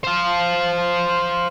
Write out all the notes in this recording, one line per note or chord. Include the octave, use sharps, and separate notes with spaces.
C5 F5